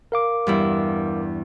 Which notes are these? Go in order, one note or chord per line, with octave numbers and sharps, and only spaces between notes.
A#4 F5 D6
E2 G2 E4